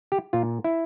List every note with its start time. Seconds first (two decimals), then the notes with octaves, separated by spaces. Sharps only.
0.12 G4
0.33 A#2 F4
0.64 E4